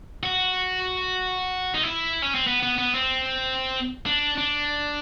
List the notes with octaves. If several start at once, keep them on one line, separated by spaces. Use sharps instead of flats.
F#4
D#4
E4
C#4
C4
B3
B3
B3
C4
D4
D4